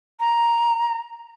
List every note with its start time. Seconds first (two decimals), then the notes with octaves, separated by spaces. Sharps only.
0.20 A#5